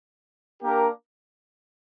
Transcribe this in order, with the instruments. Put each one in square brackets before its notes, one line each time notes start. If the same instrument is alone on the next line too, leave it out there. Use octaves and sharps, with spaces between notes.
[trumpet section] A#3 D4 G4 A#4